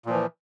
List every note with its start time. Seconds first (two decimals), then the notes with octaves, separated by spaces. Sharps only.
0.06 A#2
0.09 F3
0.13 E3